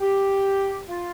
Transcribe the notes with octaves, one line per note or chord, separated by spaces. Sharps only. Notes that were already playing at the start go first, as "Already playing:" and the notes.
G4
F4